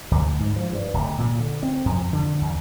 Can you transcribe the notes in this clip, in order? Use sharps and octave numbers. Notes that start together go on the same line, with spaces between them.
D2
G#2
F3
G2
D1
A#2
D3
C4
F2
D3
E2